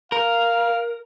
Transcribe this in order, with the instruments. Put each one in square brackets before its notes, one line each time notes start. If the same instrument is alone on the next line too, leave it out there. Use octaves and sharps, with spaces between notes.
[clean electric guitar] A#4 [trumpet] F5